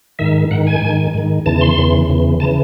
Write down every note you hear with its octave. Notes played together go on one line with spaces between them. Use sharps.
G#2 D#3 E5
G#2 D#3 F#5
G#5
G#2 D#3
G#2 D#3
E2 C#3 E3 A5
A5
C6
E2 C#3 E3
E2 C#3 E3
C#3 E3 A5